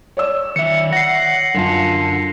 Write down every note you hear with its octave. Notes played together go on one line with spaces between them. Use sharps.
C#5 D5 E6
D#3 E5 C#7
F#5 A#6 C7
F#2 D3 F4 A5